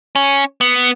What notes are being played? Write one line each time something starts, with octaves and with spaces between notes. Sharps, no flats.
C#4
B3